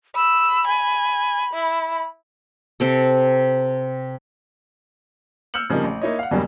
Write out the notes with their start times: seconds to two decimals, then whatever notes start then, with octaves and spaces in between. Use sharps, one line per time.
0.15 B5 E6
0.67 G#5
1.53 E4
2.80 C3 C4 A4
5.54 E6 F6 G6 C#7 F#7
5.70 C#3 F3 G3 A#3 C4 D#4
5.84 A1
6.01 A#3 D#4 E4 C#5 D#5
6.19 F5 F#5
6.31 E2 G2 B2 F#3 G3 A#3